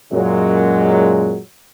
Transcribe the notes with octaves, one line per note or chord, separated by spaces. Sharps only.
F#2 A#2 F#3 G#3